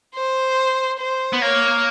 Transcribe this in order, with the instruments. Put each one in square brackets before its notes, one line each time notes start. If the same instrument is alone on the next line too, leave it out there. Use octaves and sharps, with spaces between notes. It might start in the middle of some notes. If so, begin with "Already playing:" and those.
[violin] C5
C5
[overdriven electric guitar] B3
[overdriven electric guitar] A#3 [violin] C#5